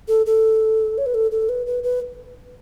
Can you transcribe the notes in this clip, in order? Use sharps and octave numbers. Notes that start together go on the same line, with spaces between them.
A4
A4
C#5
B4
A4
A4
B4
B4
B4